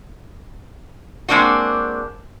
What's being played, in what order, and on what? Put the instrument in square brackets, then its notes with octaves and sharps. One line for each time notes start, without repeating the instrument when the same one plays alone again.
[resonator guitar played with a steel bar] G#3 A#3 C4 D4 F#4